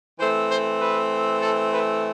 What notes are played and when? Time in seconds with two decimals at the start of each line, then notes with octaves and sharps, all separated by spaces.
0.19 E3 A3 C4 C5
0.50 C5
0.80 B4
1.41 A4
1.71 B4